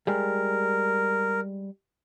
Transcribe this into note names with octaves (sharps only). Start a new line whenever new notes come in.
G3 G#3 A#4